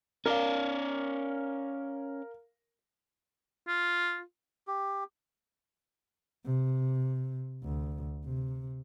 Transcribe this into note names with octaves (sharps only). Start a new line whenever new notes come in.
C#4 A#4 D5 F5
F4
G4
C3
D2
C3